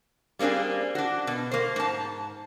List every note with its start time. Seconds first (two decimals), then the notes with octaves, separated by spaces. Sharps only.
0.39 G3 A#3 C4 D4 G#4
0.95 D4 F#4
1.27 B2
1.51 A#3 C5
1.76 G#2 A5